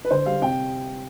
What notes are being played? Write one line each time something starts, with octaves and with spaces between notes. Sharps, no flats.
B4
D3 C5
G3 F5
C3 G5